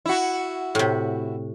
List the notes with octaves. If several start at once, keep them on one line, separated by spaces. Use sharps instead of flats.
E4 F#4
A2 C3